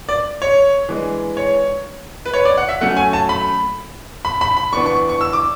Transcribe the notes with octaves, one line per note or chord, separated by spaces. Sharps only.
D5
C#5
E3 G#3 D4
C#5
B4
C#5
D5
F#5
E5
F#3 A3 C#4 F#5
G#5
A5
B5
B5
B5
B5
E3 B3 D4 C#6
C#6
C#6
E6
D6